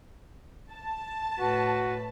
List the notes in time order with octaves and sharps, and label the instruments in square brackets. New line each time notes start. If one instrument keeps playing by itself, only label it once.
[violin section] A5
[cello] A2 B4 [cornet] F#4